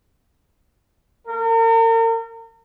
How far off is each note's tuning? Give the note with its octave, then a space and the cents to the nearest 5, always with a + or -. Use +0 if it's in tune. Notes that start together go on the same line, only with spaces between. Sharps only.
A#4 -40